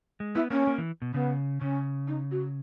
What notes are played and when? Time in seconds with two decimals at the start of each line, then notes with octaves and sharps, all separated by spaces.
0.20 G#3
0.35 B3 E4
0.51 A#3 C#4
0.67 A#3
0.78 E3
1.02 B2
1.14 C#3 B3
1.61 C#3 C#4
2.08 D#4
2.31 F#4